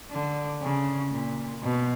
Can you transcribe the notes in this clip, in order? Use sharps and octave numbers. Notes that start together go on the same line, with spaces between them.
D3
C#3
A#2
B2